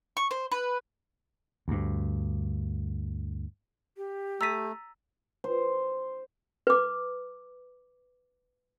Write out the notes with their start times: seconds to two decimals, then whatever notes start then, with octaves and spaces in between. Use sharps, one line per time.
0.17 C#6
0.31 C5
0.52 B4
1.68 D2 G2
3.97 G4
4.41 A3 A#5 E6 A6 B6 D#7
5.44 C5
6.67 B4 D6